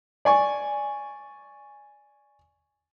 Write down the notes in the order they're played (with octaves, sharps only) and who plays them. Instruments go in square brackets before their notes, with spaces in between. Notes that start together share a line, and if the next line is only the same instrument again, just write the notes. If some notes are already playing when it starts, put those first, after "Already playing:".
[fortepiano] D5 G#5 C#6